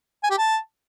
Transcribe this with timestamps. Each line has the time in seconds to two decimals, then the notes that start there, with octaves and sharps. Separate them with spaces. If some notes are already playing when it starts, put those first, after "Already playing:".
0.23 G#5
0.30 G4
0.38 A5